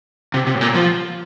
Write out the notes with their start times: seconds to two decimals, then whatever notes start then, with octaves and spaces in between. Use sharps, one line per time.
0.34 C3
0.47 C3
0.55 A2
0.61 A#2
0.75 F3